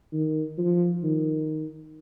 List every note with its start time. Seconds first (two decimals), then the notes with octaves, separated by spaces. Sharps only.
0.13 D#3
0.58 F3
1.03 D#3